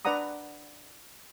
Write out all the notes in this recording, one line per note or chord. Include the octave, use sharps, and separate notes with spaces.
D4 B4 D5 F#5 A#5 D#6